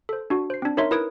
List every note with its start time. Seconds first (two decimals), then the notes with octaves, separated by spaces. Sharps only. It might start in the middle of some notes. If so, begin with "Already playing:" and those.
0.09 A4 C5
0.30 D4 F#4
0.50 C5 C7
0.62 C4 D4
0.77 D#4 A#4 C#5 D#5 E5 C6
0.91 E4 A#4 B4 D#6 G#6 D7